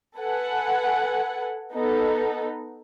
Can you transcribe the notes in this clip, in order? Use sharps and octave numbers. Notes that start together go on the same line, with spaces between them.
A4 B4 F#5 G#5
B3 D#4 A4